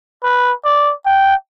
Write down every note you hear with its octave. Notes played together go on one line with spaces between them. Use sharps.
B4
D5
G5